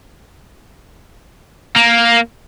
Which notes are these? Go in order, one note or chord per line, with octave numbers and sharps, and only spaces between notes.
A#3